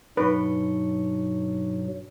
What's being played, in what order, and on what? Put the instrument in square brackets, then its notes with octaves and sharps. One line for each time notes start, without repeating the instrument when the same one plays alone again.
[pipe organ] G2 B2 F#3 [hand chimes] D#4 C#6 [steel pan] B4